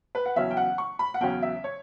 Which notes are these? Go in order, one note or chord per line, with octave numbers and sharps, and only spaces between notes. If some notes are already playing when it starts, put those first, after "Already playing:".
B4
F#5
E2 C#3 F#3 C#4 E5
G5
F#5
C#6
B5
F#5
E2 C#3 F#3 C#4 G5
E5
C#5